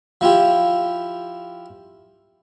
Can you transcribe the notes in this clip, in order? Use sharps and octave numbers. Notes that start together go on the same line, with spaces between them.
F3 E4 F4 G4